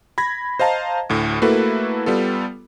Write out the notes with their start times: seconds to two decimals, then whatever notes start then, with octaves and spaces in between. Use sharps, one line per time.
0.18 B5 G#6 A#6
0.59 C5 D#5 F5 A5 A#5
1.10 D2 A2
1.42 A3 A#3 E4 F#4 A4 B4
2.06 G3 B3 F4 A4